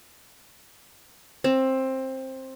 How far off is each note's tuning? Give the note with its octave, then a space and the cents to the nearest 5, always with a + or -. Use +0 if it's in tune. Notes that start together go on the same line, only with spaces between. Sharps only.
C4 +15